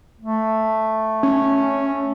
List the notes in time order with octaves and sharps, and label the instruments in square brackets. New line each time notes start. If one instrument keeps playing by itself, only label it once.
[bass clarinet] A3
[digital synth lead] C#4